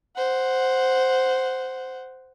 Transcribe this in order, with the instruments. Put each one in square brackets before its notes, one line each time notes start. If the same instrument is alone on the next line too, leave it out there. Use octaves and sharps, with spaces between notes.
[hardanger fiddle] C5 F#5